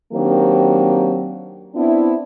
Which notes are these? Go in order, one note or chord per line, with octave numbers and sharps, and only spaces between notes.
D#3 F#3 A#3 C4 D4 G4
B3 C4 D4 E4